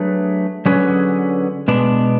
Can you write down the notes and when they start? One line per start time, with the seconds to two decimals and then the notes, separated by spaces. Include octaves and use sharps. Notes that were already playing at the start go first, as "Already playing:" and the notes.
Already playing: F#3 A3 D4 G#4 B4
0.65 D3 F#3 C#4 G#4 B4
1.68 B2 G#3 B3 D4